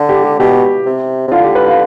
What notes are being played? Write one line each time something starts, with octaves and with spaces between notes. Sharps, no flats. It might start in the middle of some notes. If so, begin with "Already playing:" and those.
Already playing: D3
G4
G4
B2 G4
C3
C3
D3 F4
G4
B4
F5